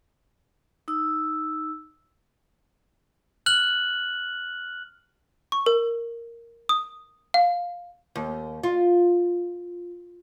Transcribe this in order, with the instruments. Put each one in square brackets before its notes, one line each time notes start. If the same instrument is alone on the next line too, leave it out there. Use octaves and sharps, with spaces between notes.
[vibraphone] D#4 E6
[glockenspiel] F6 F#6 F#7
[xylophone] C#6
A#4
D#6
F5
[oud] D#2
F4